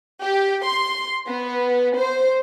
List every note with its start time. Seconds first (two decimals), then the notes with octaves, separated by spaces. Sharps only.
0.22 G4
0.64 C6
1.27 B3
1.97 C5